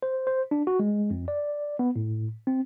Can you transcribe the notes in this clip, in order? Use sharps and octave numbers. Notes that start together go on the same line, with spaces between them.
C5
C5
D4
F#4
G#3
F2
D5
B3
A2
C4